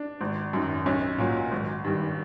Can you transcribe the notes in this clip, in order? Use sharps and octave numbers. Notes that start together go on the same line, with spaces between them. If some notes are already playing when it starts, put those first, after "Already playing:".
Already playing: D4
G#1
F#2 D#3
B1 C#4
A#2 F#3
G#1
G2 D#3